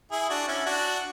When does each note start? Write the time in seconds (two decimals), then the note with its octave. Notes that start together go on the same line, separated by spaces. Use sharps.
0.12 E4 G#4
0.29 D4 F#4
0.48 C#4 E4
0.66 D4 F#4